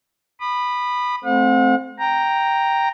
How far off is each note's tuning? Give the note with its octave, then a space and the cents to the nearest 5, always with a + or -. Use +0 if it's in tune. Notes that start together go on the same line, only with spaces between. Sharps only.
B5 +0 D#6 -40
A3 -20 C4 +0 F#5 -45
G5 +0 A#5 +0